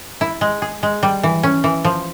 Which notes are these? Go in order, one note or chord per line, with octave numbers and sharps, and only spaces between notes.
E4
G#3
G#4
G#3
G3
E3
C#4
E3
F3